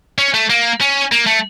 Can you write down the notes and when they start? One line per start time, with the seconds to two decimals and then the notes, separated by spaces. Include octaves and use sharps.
0.19 C#4
0.34 A3
0.50 A#3
0.81 C#4
1.12 A#3
1.27 A3